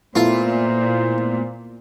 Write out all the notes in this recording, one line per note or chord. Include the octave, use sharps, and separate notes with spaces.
A#2 A3 B3 E4 F4 C5